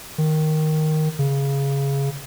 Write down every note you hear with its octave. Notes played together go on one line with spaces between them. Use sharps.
D#3
C#3